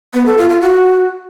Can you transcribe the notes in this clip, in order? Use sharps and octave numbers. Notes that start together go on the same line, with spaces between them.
B3
A4
F4
F4
F#4